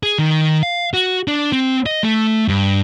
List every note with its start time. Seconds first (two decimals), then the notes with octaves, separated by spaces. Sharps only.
0.03 G#4
0.19 D#3
0.63 F5
0.94 F#4
1.28 D4
1.52 C4
1.86 D#5
2.03 A3
2.48 G2